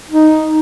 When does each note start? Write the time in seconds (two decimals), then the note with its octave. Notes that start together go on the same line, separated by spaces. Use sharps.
0.09 D#4